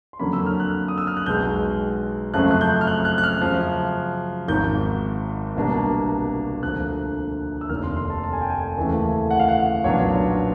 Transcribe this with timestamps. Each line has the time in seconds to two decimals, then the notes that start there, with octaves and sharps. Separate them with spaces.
0.13 C6
0.19 F2 D3 F#3 A#3 C#4 B5
0.33 E6
0.46 F6
0.60 F#6
0.88 D#6
0.98 E6
1.07 F6
1.17 F#6
1.26 B1 B2 G#3 G6
2.34 F#2 C#3 F3 A3 C4 F#6
2.51 F#6
2.61 G6
2.81 F6
2.87 F#6
3.05 F#6
3.18 F#6
3.24 F6
3.41 F#2 C#3 F3
4.48 G#1 G#2 D#3 G6
5.55 C2 B2 G3 A#3 D4
6.62 D2 D3 F3 A#3 F#6
7.61 E6
7.69 F1 D#2 D#3 F6
7.83 C6
7.97 C6
8.10 A5
8.24 A5
8.33 G#5
8.42 G5
8.50 G#5
8.77 D#2 C#3 E3 A3
9.31 F#5
9.39 F5
9.48 F#5
9.84 B1 A#2 F#3 B3 D4 C#5